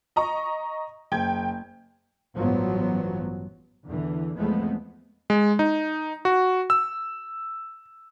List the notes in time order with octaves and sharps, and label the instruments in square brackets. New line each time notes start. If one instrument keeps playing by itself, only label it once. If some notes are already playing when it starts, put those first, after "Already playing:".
[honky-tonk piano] D#5 A#5 C#6
F#1 G5 G6 G#6
[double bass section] A1 G2 F3 F#3 B3
E2 D3 E3
E2 F3 G#3 A3 B3 C4
[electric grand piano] G#3
D#4
F#4
E6